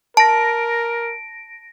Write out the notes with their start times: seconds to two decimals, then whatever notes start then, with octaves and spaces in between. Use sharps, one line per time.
0.17 A#4 A5 A#6 D7